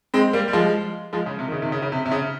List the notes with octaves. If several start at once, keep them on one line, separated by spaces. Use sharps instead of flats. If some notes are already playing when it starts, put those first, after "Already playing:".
G#3 C4
G3 A#3
G3
F3 G#3
F3 G#3
C#3
C3
D#3
C#3
C3 D#3
C#3
C#3
C3
C3
C#3